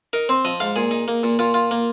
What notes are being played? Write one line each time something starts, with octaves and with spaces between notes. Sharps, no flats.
D#4 A#4
C4 C5
F3 D#5
G#2 F5
A#2 G#4
D#4
A#3
A#2
A#2 F4
F4
A#3